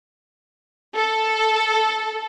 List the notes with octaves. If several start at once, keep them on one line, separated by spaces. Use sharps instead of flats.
A4